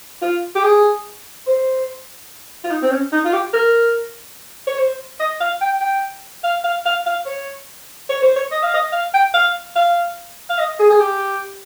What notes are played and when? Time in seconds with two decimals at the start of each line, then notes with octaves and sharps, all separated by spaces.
0.22 F4
0.55 G4
0.64 G#4
1.47 C5
2.64 F4
2.71 D#4
2.82 C4
2.91 C#4
3.12 D#4
3.25 F4
3.33 G4
3.53 A#4
4.67 C#5
4.79 C5
5.20 D#5
5.40 F5
5.61 G5
5.81 G5
6.44 F5
6.64 F5
6.86 F5
7.06 F5
7.26 C#5
8.09 C#5
8.22 C5
8.36 C#5
8.51 D#5
8.63 F5
8.74 D#5
8.92 F5
9.14 G5
9.34 F5
9.76 F5
10.50 F5
10.58 D#5
10.79 G#4
10.90 G#4
11.00 G4